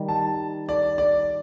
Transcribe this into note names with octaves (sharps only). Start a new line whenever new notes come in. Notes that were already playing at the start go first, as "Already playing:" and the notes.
Already playing: D#3 G3
A5
D5
D5